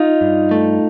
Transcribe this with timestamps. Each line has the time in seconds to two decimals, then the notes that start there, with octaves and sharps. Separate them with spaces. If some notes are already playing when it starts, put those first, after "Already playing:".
Already playing: D#4 F4
0.21 G2
0.51 A3